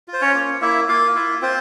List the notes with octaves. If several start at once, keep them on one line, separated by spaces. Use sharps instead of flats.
F4
C5
C#4 C#5
A#3
A#3 E4 E5
A#3 F4 F5
E4 F4 E5
C4 F4 C5